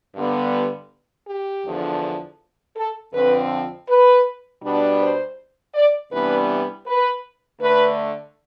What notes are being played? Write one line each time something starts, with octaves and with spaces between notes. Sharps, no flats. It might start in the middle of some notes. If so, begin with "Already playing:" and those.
G2 D3 G3 B3
G4
E2 D3 F3
A4
F2 D3 F3 C4 B4
B4
B2 G3 B3 D4
C5
D5
C3 E3 G3 B3 D4 B4
B4
D3 A3 D4 B4